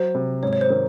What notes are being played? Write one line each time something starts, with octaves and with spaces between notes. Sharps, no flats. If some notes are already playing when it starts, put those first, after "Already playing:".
Already playing: F#3 C5
C3
G#2 C#5
C#5
C5
D#3